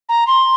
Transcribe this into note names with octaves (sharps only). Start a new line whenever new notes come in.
A#5
C6